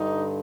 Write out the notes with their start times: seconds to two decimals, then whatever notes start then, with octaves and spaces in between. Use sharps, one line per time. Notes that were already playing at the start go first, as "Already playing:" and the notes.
Already playing: G2 D3 D#4